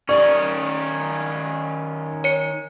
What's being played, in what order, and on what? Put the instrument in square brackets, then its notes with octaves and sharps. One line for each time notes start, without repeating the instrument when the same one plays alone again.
[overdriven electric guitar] D#3 C#4 [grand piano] D5 [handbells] C#6
[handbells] C#5 C#7